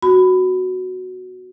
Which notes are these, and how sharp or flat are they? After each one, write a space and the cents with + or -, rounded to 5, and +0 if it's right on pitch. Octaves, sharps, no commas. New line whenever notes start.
B3 +0 F#4 +0 B5 +15